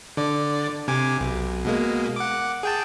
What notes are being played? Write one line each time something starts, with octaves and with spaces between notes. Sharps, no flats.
D3 D5
C3 G#5 D6
B1
B2 G#3 A#3
F#5 D6
G#4 G5 A5